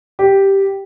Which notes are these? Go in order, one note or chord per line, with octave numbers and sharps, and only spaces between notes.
G4